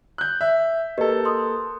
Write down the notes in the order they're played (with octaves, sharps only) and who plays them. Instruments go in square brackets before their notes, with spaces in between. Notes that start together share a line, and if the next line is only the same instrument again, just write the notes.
[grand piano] F#6 G6
E5
[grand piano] A#3 A4 [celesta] G4 B4 D#5
[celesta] C6 D#6